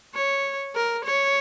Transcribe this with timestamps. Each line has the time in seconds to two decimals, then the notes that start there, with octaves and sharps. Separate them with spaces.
0.14 C#5
0.75 A#4
1.04 C#5